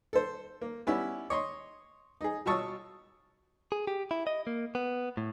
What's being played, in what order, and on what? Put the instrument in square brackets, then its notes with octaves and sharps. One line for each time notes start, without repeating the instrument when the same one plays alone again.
[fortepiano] A4 C5
A#3
G3 B3 C#4 E4
C#5 D#5 C6
D#4 G#4
B2 F4 A5 C#6 D#6 E6
[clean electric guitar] G#4
G4
E4
D#5
A#3
B3
A2